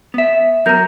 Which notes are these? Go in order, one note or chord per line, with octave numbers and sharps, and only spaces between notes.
B3 E5
F#3 B3 A#4 A#5 G6